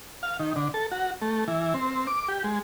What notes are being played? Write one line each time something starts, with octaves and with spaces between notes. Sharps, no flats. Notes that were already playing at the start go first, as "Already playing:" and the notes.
F5
D#3
D3
A4
F#4
A3
E3
C4
D6
G4
G#3